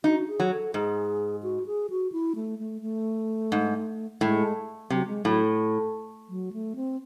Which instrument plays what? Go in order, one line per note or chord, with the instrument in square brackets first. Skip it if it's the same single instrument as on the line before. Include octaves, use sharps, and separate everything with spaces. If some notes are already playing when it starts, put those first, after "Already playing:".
[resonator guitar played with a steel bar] D#4 [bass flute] F#4
[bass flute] G#4
[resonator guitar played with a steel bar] F#3
[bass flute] A4
[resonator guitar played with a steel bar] G#2 [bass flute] G#4
[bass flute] F#4
G#4
F#4
E4
A3
A3
A3
[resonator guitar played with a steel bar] G#2
[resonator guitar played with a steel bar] A2 [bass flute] G#3
[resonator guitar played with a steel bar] C3 [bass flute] F#3
[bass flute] G#3
[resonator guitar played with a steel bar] A2 [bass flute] F#3
[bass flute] F#3
A3
C4